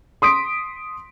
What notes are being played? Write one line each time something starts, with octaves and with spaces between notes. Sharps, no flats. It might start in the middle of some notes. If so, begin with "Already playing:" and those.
C6 D#6 B6 D7